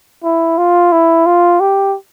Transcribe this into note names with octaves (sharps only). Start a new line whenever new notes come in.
E4
F4
E4
F4
G4